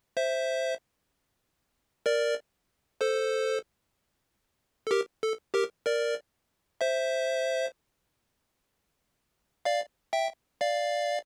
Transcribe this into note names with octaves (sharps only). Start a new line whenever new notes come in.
C5 E5
A#4 D5
A4 C5
A4
G4 A#4
A4
G4 A#4
A#4 D5
C5 E5
D5 F5
E5 G5
D5 F5